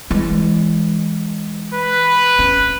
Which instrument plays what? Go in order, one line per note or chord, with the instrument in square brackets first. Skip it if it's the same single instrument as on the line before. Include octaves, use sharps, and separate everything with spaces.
[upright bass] E3 G#3
[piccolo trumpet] B4
[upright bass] C#4